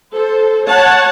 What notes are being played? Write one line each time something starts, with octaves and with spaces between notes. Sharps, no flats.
A4 C5
C#5 F#5 A5